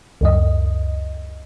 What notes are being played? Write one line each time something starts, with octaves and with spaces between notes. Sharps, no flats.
C#2 F#2 D#5